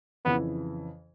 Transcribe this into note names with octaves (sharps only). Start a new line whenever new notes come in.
F2 C#3 E3 B3